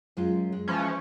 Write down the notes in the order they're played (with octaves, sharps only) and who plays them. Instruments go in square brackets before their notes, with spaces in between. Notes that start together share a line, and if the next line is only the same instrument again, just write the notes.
[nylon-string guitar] F#2 G#3 F4
G#3
[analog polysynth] E3 F3 C#4